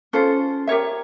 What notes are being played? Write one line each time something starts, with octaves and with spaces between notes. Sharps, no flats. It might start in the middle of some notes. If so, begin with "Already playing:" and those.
C#4 F4 A4 C5
G4 A#4 C#5 E5